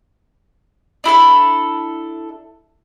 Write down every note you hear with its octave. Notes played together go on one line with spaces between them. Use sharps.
D4 E4 A4 B5